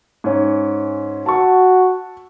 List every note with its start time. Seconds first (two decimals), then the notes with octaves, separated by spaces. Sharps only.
0.24 G#2 C#4
1.26 F#4 A5 C#6